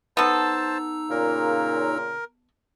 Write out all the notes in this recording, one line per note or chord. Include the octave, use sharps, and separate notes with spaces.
B3 D#4 A4 C5 A5 A#5 E6
A#2 C#3 A#4